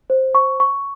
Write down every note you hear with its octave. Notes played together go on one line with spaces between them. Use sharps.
C5
C#6
C#6